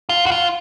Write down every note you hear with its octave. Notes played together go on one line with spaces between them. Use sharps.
F4
F#4
F4